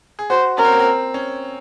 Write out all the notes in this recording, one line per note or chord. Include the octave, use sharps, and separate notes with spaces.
G#4
F#4 C5
C#4 A#4
C4
A#3
C4
C#4